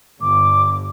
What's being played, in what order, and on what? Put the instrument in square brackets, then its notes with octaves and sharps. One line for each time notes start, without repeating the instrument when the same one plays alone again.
[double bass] G1 D3 [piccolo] D6